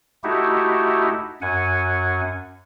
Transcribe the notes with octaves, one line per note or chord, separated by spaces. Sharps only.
A3 D#4 E4 F#4 G4
F#2 F#5 G#5